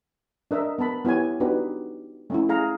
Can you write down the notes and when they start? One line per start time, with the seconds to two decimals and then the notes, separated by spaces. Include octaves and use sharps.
0.51 D4 A#4 D#5 E5
0.78 B3 A#4 A5 B5
1.05 B3 E4 G4 C#5 G#5
1.40 B3 D4 D#4 F#4 G4 B4
2.30 A3 C#4 E4
2.49 G#4 F5 A#5